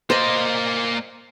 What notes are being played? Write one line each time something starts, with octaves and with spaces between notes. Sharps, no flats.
A#3 C5 D5 D#5